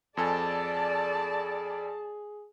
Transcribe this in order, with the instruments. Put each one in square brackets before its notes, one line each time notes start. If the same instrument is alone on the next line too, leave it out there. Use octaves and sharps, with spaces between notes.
[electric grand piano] F2 A4 G#5 [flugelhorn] G#4 [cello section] D5 [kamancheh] A5